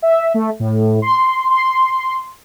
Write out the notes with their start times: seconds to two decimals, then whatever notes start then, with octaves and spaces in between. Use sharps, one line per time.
0.02 E5
0.34 A3
0.60 A2
1.02 C6
1.50 C6